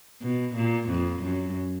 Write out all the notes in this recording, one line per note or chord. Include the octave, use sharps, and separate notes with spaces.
B2
A#2
F2
F#2